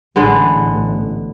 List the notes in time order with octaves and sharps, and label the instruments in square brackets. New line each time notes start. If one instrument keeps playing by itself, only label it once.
[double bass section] A1 [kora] D3 G#3 B3